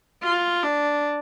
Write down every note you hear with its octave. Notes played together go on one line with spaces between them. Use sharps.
F4
D4